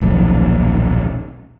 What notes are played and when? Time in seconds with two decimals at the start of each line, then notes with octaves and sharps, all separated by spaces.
0.01 D#1 B1 A#2 F3